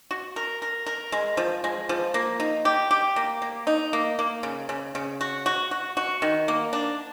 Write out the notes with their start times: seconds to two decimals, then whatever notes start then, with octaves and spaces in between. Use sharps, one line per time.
0.11 F#4
0.36 A#4
0.62 A#4
0.86 A#4
1.12 G#3
1.37 F3
1.64 G#3
1.89 F3
2.14 A#3
2.40 D#4
2.65 G4
2.91 G4
3.16 A#3
3.42 A#3
3.67 D#4
3.93 A#3
4.19 A#3
4.43 C#3
4.69 C#3
4.95 C#3
5.21 F#4
5.46 F#4
5.71 F#4
5.97 F#4
6.22 D#3
6.48 A#3
6.73 D4